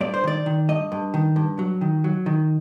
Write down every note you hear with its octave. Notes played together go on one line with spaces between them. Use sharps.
G2 D5
C5
D#3 D5
D#3
G2 D#5
G2
D#3
G2
F#3
D#3
F#3
D#3